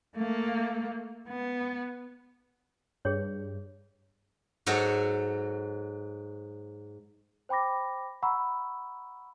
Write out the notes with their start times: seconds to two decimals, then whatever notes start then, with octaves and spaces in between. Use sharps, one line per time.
0.16 A3 A#3
1.28 B3
3.05 G2 G#4 C#5
4.66 G#2 F#3 F#4 A4 C#5
7.49 C5 G5 B5 D6 A#6
8.23 F#5 A#5 B5 C#6 E6